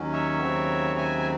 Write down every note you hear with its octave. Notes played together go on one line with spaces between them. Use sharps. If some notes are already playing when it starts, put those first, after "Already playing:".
Already playing: D#2 D#3 F#3 C#4
C#5 E5
D#2 C#3 F#3 C4
E5 G#5
G#5